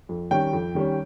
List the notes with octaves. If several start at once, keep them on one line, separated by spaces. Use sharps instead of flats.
F2
D#3 G3 C#4 G5
F2
D#3 G3 C#4